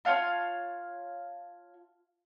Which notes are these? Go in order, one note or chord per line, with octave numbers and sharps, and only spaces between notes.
F4 C#5 F5 A5